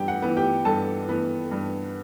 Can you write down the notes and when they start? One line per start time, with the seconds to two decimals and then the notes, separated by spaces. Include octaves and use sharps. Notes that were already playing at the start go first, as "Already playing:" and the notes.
Already playing: G2 E3 B3 G4 G5
0.08 F#5
0.22 E3 B3
0.37 G4 G5
0.65 G2 A4 A5
1.07 E3 B3
1.51 G2